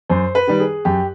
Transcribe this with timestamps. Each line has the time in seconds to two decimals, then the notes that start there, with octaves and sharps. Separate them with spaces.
0.09 F#2 C5
0.35 B4
0.48 D#3 G3
0.60 G#4
0.85 F#2 G4